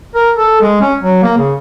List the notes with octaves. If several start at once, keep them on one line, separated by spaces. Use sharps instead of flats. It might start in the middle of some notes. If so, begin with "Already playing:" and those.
A#4
A4
G#3
C#4
F#3
A#3
C#3